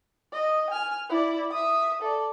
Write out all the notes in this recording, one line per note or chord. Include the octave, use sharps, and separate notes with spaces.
D#5
G#5 F6
E4 D5
E5 D#6
A4 D5